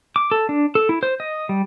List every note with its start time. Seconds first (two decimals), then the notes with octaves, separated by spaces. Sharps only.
0.16 D6
0.31 A4
0.49 D4
0.75 A4
0.89 E4
1.03 C5
1.20 D#5
1.49 G3